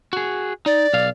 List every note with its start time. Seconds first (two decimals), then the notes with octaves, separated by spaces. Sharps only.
0.13 F#4 G#4
0.66 D#4 D5
0.93 B1 F5